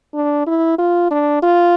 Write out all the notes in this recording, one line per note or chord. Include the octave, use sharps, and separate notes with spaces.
D4
E4
F4
D4
F4